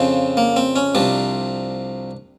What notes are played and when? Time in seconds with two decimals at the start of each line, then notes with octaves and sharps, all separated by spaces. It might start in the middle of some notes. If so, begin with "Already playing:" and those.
Already playing: F2 C#3 F3 C4
0.37 A#3
0.56 C4
0.76 C#4
0.95 C2 C3 F3 D4